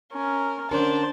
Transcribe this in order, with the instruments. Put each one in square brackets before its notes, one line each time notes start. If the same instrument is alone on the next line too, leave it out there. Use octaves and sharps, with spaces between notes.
[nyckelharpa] C#4 [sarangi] A#4
[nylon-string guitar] D3 C#4 A#4 [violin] D4 [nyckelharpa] C5 [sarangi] A5